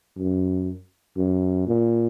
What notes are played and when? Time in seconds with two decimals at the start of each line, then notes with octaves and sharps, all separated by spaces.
0.17 F#2
1.17 F#2
1.67 A#2